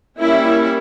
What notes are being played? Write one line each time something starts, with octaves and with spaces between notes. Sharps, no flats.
G3 A#3 C#4 E4